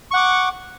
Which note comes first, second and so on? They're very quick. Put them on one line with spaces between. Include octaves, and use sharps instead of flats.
C#6 F#5 D6